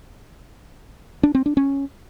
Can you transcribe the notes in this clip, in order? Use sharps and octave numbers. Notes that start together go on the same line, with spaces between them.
D4
C4
D4
C#4